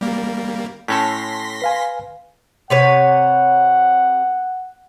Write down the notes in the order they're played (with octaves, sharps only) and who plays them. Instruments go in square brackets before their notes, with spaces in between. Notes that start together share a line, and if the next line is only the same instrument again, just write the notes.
[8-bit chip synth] G3 A#3
[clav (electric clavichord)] A2 C#4 A4 [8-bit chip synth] C6 A#6 B6
[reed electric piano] B4 F5 G#5
[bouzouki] C3 B4 C#5 [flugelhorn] F#5